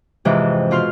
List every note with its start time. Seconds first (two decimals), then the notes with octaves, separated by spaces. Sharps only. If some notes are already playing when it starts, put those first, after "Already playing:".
0.25 F2 G#2 C3 E3
0.71 B2 F4 C6 F6